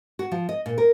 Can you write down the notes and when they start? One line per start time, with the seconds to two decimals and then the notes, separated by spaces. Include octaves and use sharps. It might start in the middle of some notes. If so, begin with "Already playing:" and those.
0.19 F#4
0.32 F3
0.49 D#5
0.66 A#2
0.78 A#4